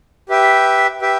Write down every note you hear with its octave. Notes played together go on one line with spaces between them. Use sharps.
G4 B4 E5 G5
G4 B4 E5 G5